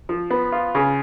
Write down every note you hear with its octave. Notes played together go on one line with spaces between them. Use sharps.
F3
B3
F4
C#3